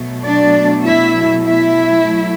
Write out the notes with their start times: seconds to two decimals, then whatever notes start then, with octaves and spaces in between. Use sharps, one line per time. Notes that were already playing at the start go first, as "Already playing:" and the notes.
Already playing: B2 F#3 A3
0.24 D4 D5
0.84 E4 E5
1.44 E4 E5
2.04 F#3 A3